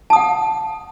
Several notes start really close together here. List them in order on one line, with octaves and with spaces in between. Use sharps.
A5 D#6 F#5